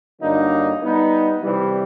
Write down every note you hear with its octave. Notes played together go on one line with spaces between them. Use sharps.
G2 D3 F#3 A#3 D#4
G3 B3 D#4
C3 E3 G3